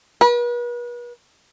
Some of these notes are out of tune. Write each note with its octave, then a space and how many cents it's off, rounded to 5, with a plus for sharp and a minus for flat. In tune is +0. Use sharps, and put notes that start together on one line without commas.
B4 -40